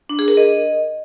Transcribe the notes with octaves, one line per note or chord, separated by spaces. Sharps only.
D4
G#4
A#4
D#5